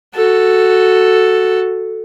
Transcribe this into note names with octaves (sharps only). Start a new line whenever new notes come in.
F#4 A4